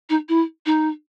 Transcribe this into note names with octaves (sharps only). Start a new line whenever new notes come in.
D#4
E4
D#4